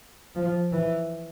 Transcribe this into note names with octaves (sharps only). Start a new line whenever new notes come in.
F3
E3